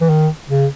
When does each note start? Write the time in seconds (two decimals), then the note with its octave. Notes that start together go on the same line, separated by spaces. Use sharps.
0.01 E3
0.09 D#3
0.50 C#3